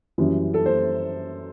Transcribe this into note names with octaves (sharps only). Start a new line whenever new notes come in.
F#2 E3 G3
A4
C5